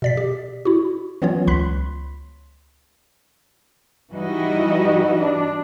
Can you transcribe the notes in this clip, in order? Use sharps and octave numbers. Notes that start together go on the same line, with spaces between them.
B2 D5 B6
G4
E4 F#4
E3 F#3 B3 C#4 F4 C#5
C#2 B5 C6 F#6 B6
E3 G3 D#4 E4 F#4 D#5
D4